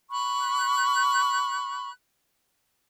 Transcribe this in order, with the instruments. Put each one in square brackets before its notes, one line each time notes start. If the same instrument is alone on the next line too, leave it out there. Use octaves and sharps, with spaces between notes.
[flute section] B5 C#6 F#6